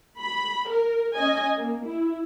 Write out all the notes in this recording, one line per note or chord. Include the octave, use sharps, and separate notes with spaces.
B5
A#4
C#4 D#5 G#5
A#3
E4